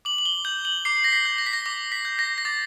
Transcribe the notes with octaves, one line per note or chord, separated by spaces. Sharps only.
D6 F#7
F#7
G7
G6 F#7
F#7
D6 C7
A#6
B6
G6
A#6
B6
A#6
D6 A#6
B6
G6
A#6
A#6
D6 A6